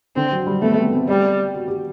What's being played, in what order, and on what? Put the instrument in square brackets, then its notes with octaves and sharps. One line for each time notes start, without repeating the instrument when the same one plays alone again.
[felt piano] D3 [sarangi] C4
[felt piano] F#3
G3
[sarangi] A3 [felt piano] B3
[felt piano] C4
C4
[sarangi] G3
[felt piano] F#4
G4